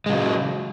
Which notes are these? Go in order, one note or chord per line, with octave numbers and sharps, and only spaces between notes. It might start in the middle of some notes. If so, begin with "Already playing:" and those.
C#3 F#3 G#3